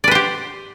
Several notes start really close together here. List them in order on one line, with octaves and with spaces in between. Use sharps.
D5 B4 C5 G4